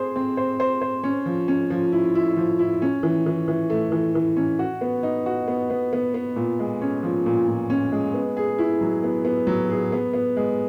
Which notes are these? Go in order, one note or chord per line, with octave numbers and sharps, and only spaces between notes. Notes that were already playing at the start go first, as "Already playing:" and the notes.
Already playing: C4 G#4 C5
C4
C5
C5
C5
C#4
F3
C#4
F3
E4
E4
F3
E4
C#4
E3
E3
E3
A3
E3
E3
C#4
F#4
B3
D#4
F#4
B3
B3
B3
B3
A#2
G#3
C#4
F3
A#2
A#2
C#4
G#3
B3
G#4
E4
F#3
B3
B3
F#3
G#4
B3
B3
G#3